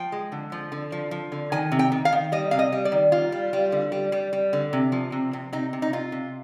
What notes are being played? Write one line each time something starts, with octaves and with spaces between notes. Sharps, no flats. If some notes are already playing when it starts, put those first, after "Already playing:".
Already playing: F3 G5
G#3
D3
F3
D3
F3
F3
D3
D#3 G#5
C3
G5
D#3
F5
D#3
G3 D#5
C3 F5
D#5
G3
D5
D#3
G3 F4
G3
G3
D3
G3
G3
G3
D3
C3
F3
C3
C3
C3 D#4
C3
D#4
C3 F4
C3